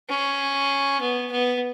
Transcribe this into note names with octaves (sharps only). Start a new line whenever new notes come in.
C#4
B3
B3